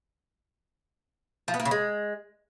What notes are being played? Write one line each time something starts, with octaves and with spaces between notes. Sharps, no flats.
F3
B3
A#3
C#3
G#3